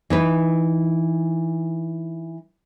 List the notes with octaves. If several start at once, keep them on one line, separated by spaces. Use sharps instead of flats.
E3 D#4 B4